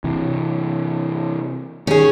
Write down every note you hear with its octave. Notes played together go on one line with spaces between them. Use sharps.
C3 E3
D#3 C#4 G#4